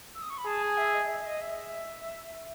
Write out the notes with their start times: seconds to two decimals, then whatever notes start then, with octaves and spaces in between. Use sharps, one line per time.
0.15 E6
0.22 D#6
0.30 C#6
0.38 B5
0.46 G#4 A5
0.63 G#5
0.78 E5
0.94 D#5
1.05 D#5
1.09 E5
1.20 E5
1.26 D#5
1.41 E5